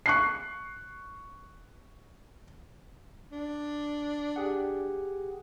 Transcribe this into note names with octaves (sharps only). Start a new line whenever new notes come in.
C#6 F#6 C7
D4
G4 G#4 F#5